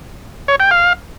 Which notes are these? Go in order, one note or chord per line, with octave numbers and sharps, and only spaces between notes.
C#5
G5
F5